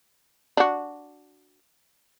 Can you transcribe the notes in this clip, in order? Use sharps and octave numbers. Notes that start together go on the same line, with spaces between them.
D4 F#4